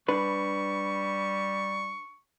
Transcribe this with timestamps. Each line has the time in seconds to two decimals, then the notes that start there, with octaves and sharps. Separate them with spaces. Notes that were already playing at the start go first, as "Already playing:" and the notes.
0.08 G3 D4 B4 C#6